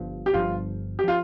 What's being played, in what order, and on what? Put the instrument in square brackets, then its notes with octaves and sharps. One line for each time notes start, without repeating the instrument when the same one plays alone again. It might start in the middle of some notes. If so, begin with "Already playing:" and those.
Already playing: [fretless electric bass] G1 G2 F3
[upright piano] G4
[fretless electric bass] G1 G2 F3 [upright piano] F4
[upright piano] G4
[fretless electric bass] F3 [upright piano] F4